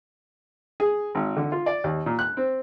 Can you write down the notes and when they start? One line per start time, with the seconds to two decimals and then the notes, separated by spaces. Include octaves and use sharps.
0.80 G#4
1.15 G#1
1.37 D3
1.52 F4
1.66 D5
1.84 D#2
2.06 A#2
2.19 F#6
2.37 C4